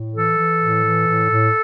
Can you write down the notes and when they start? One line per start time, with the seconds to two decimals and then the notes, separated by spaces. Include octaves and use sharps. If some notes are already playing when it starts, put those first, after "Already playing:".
Already playing: A2
0.13 E3 A4
0.36 E3
0.59 A2
0.83 E3
1.07 A2
1.30 A2